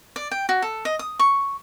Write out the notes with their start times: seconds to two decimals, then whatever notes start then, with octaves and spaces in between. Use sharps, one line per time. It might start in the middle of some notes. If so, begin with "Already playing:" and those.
0.16 D5
0.31 G5
0.49 F#4
0.62 A4
0.85 D#5
0.99 D#6
1.19 C#6